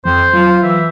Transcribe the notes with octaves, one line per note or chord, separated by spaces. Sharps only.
F2 F3 C5
F#3 F4
E3 E5